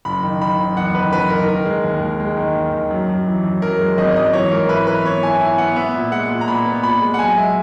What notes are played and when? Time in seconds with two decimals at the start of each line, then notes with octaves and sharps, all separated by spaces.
0.05 F#1 B5
0.23 D#3
0.41 D#3 B5
0.59 F#1
0.77 E2 F#5
0.95 D#3 B4
1.13 F#1 B4
1.30 D#3 A#4
1.48 D#3 A#4
1.66 G#3
1.84 D#2
2.02 G#3
2.20 G#3
2.37 D#3
2.55 D#2
2.73 D#3
2.91 F#2
3.09 F#2
3.27 E3
3.44 F#2
3.62 F#2 A#4
3.80 G#3
3.98 G#1 D#5
4.16 F#2 D#5
4.33 E3 C#5
4.51 G#2 A#4
4.69 E4 B4
4.87 E3 B4
5.04 B3 C#5
5.23 E4 G#5
5.40 E4 G#5
5.58 B3 F#5
5.76 B3 E5
5.94 A#2
6.12 G#3 F#5
6.30 A#2
6.41 A#5
6.48 A#2 B5
6.66 B3
6.83 A#2 B5
7.02 G#3
7.14 F#5
7.19 B1 G#5
7.37 G#3 E5